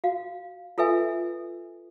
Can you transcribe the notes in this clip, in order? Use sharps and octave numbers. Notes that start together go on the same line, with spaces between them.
F#4 F5
F4 A4 B4 E5 G#5